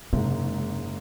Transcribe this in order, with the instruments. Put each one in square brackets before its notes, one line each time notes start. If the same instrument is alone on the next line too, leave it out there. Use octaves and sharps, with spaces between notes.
[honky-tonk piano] F#1 G#2 [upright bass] C3